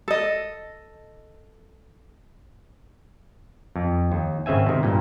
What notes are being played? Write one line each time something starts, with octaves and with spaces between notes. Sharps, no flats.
A4 D#5
F2
D#2
G#1 C#3 C4 E5 G#5
C3 D#3
G2 A#2